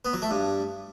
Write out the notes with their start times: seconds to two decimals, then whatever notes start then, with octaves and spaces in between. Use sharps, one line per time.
0.05 B3
0.13 F#3
0.22 A3
0.31 G2